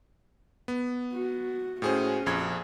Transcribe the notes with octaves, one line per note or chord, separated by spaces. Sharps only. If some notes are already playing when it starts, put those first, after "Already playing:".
B3
F#4
A2 C#4 F#4 G#4 C5
A#1 F2 G#4 G#6